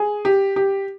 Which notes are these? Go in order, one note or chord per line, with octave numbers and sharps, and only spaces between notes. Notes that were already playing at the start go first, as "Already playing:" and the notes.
Already playing: G#4
G4
G4